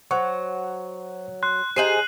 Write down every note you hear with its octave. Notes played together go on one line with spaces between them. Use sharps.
F#3 C5 F#5 C#6
C6 F#6
D#4 G4 G#4 C5 C7 D#7 F#7